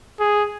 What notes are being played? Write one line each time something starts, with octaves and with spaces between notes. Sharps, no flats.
G#4